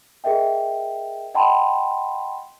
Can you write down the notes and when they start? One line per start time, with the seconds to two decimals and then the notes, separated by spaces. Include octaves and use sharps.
0.24 G#4 A#4 D#5 E5 G5
1.34 D#5 F#5 G5 A5 B5 C6